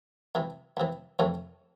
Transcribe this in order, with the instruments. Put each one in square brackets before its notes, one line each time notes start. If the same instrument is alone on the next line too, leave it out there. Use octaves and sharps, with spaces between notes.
[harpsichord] C#2 C3 E3
C#2 C3 E3
F2 C3 E3 A3 C#4